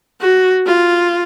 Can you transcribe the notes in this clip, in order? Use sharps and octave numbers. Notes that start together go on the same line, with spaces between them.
F#4
F4